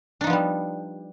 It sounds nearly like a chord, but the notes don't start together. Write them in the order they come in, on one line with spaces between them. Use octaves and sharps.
D4 D#4 F3 B3 G3